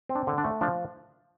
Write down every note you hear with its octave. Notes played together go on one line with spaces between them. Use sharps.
C4
D4
D3
D4
A3
F3 D4